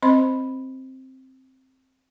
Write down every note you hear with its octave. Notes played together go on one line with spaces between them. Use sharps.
C4 C5 D#5 B5 C6